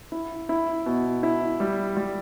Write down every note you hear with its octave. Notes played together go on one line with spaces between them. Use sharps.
E4
E4
B2
E4
G3
G3